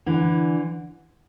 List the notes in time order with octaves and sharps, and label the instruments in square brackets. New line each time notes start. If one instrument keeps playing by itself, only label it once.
[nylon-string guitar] D3 E3